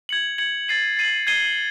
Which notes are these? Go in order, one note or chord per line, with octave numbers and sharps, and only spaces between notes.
G#6 C#7 F#7
G#6 C#7 F#7
A6 C7 D#7 F#7
A6 C7 D#7 F#7
G#6 C7 D#7 G7